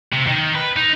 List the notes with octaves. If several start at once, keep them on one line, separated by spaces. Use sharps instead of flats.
C3
D#3
B4
D#4